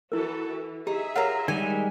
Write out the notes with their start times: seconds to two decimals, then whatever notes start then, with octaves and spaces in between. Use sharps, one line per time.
0.12 E3 E4 F#4 A4 A#4
0.47 E3
0.87 D#4 G4 G#4 E5
1.15 F4 A#4 C#5 F#5 A#5
1.48 D#3 G3 G#3 G#5